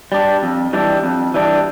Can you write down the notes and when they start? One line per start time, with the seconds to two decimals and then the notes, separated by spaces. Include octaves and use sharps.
0.12 G3 D4
0.43 F2
0.73 E3 G3 D4
1.04 F2
1.34 E3 G3 D4